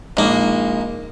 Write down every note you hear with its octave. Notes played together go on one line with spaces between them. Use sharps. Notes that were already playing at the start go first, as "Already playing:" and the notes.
A#1 G#3 A#3 D#4